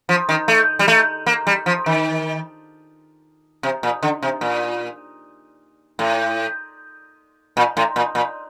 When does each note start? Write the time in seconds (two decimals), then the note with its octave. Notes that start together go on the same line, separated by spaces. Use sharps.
0.09 F3
0.29 D#3
0.48 A3
0.79 G3
0.88 A3
1.26 A#3
1.47 G3
1.66 F3
1.86 D#3
3.63 C3
3.83 A#2
4.03 D3
4.23 C3
4.41 A#2
5.99 A2
7.57 A#2
7.77 A2
7.96 A#2
8.15 A#2